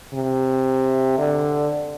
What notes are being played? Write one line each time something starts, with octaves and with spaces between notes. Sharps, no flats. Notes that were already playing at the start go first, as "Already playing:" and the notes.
C3
D3